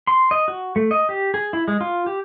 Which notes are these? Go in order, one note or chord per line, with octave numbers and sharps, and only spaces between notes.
C6
D#5
F#4
A3
D#5
G4
G#4
E4
G#3
F4
G4